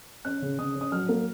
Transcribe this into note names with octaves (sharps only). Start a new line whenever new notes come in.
C#4 F#6
C#3
C#3 D#6
C#4
D#6
F#3 F6
A#3